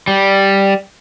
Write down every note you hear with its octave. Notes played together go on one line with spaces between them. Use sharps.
G3